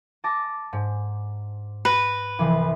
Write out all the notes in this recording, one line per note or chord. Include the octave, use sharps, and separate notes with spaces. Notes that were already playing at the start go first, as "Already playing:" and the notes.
A5 D6 A#6
G#2
B4 A#6
C2 E3 F3